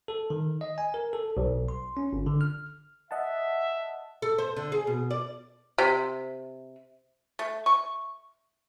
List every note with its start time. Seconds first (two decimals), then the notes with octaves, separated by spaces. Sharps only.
0.08 A4
0.30 D#3
0.61 D#5
0.78 G#5
0.94 A#4
1.13 A4
1.37 B1
1.68 C6
1.97 C#4
2.13 G1
2.26 D3
2.41 F6
3.11 D#5 E5 F#5 A5
4.22 A4
4.38 C5
4.56 D3
4.72 G#4
4.87 B2
5.11 D5
5.78 C3
7.39 A3
7.66 C#6